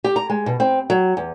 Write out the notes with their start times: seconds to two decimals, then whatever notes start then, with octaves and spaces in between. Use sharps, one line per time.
0.04 G4
0.16 A#5
0.30 G#3
0.46 B2
0.60 C4
0.90 F#3
1.17 E2